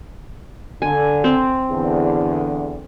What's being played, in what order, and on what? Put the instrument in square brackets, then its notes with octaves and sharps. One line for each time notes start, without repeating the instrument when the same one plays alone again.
[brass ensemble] D3 [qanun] G#5
[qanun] C4
[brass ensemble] E2 D3